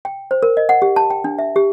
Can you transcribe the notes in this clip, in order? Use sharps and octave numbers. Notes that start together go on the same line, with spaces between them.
G5
C5
A#4
D#5
F#5
G4
A5
G5
D4
E5
G4